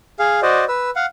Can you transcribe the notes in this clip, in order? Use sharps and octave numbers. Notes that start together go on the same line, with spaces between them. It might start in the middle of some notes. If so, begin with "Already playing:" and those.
G#4 F5
F#4 C5 D5 D#5
B4 E6
F5 F#5